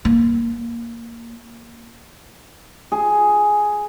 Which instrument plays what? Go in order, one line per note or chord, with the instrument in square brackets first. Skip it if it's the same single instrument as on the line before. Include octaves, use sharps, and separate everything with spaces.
[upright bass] A#3
[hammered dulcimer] G#4